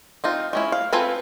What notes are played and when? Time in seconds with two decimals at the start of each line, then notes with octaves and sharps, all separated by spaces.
0.24 C4 D#4 F4
0.53 G#3 C#4 E4
0.72 F5
0.93 C4 F4 A4 B4 G#5